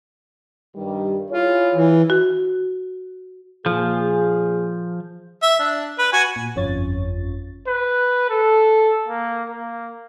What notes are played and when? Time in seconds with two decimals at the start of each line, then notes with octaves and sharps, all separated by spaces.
0.76 G2 D#3 G3
1.31 E4 F4 G#4 C#5
1.75 E3
2.10 F#4
3.66 A#2 F3 G#4
5.42 E5
5.59 D4
5.99 B4
6.13 F#4 G#5
6.36 A#2
6.55 G1 F2 C#4 F4 C#5 A6
7.67 B4
8.30 A4
9.08 A#3
9.50 A#3